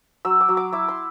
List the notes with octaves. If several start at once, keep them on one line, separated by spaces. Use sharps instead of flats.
F#3 E6
D6
F#3
D6
E4 D6
C6